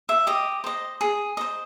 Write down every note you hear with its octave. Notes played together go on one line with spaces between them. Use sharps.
E5
G4 D#5
C5 D#5
G#4
C5 D#5